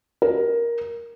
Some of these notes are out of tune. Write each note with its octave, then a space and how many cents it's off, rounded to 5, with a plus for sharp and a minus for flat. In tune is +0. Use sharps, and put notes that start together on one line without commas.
A#4 +10